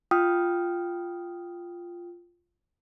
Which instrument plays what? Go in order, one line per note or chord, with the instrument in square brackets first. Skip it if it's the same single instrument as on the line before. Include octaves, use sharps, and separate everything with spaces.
[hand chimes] F4 G5 D#6 F6